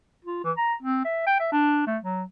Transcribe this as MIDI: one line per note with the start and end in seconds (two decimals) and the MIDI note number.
0.25 0.42 65
0.44 0.52 52
0.57 0.74 82
0.83 1.03 60
1.05 1.22 76
1.27 1.35 79
1.40 1.49 76
1.52 1.85 62
1.87 1.98 57
2.03 2.23 54